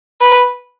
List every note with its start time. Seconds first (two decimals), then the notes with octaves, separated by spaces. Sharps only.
0.21 B4